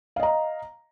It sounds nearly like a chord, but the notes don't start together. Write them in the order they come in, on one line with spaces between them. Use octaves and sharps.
F5 D#5 A#5